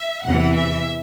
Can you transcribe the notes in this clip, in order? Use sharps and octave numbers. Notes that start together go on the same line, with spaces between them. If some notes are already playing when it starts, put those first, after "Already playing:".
Already playing: E5
E2 C3 E3 F#5
E5